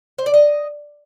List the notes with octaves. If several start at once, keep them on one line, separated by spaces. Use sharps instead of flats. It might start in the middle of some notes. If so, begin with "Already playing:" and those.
C5
D5
D#5